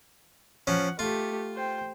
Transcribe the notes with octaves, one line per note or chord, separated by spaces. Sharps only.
F3 C#4 F#5
A3 F4 G4
C5 G5